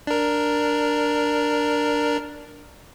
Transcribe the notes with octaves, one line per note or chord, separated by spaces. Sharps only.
D4 A#4